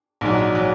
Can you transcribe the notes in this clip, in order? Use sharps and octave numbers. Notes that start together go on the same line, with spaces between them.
A#1 G#2 F#3
F#3